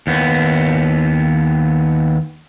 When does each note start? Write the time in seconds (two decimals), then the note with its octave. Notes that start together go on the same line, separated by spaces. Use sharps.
0.07 D#2 B3